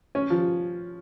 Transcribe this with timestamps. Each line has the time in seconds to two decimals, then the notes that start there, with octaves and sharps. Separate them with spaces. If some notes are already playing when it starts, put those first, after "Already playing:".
0.15 C#4
0.30 F3